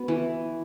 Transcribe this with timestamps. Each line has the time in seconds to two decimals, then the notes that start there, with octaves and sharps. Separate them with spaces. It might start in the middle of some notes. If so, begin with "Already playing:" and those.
Already playing: B3 F#4
0.08 E3